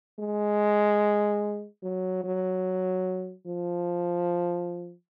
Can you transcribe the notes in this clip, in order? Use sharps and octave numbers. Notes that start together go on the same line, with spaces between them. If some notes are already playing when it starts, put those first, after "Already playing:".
G#3
F#3
F#3
F3